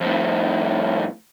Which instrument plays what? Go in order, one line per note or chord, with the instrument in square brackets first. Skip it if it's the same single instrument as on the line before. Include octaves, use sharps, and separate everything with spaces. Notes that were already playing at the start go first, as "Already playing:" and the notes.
[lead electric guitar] F2 A2